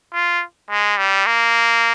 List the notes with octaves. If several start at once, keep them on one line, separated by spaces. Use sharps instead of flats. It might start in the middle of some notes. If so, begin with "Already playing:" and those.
F4
G#3
G3
A#3